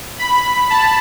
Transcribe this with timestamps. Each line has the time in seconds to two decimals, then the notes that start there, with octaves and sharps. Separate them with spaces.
0.19 B5
0.70 A5